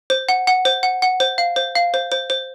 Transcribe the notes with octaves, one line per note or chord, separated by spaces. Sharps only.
C5
F#5
F#5
C5
F#5
F#5
C5
F5
C5
F5
C5
C5
C5